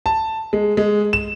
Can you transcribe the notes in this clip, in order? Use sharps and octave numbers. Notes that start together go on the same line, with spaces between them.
A5
G#3
G#3
E7